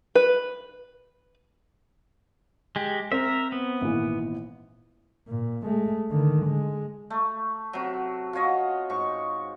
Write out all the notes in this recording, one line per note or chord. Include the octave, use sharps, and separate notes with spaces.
B4
G#3 G4
C4 A#4 E5
B3
G#1 A#2 E3
A#2
G#3 A3
D3 D#3
G#3
A3
C3 F#3
F4 F#4 C#5 D#5
G#2 C#6